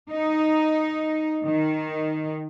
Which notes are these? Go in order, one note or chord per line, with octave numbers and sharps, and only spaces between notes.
D#4
D#3